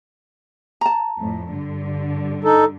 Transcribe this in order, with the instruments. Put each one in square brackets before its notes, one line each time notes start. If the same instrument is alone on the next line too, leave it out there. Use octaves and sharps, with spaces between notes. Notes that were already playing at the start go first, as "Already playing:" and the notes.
[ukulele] A5 A#5
[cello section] F2 A2
G2 D3
[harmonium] D#4 A4